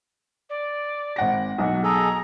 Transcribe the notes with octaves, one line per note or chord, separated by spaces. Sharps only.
D5
G#1 F#5 A#6
B1 F#4
G#4 A4 A#5